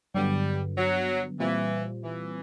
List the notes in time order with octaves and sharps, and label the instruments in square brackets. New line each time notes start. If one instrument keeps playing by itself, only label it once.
[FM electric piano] G2 D3 F#3 B3 [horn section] G3
[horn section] F#3
[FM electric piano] A#2 G3 C4 F4 [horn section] E3
[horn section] E3